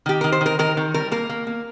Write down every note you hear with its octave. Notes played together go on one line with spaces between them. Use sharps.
D#3 G4
D#3 A#4
C5
D#3 A#4
D#3 A#4
D#3
G3 A#4
A#3 A#4
A#3
A#3